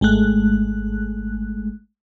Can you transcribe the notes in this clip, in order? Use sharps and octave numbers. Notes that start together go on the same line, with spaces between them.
G#1 G#3 A3 F#6